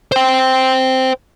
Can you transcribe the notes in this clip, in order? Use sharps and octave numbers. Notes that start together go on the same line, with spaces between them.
C5 G5